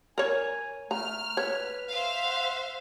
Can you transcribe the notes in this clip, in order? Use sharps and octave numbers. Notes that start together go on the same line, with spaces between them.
A#4 C#5 G#5
A3 A#5 F6
B4 C#5
C5 E5 F5
F#5